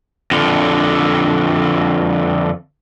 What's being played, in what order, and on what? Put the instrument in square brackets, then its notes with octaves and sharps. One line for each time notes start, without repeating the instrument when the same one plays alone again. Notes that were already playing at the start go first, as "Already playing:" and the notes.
[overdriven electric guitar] F2 D3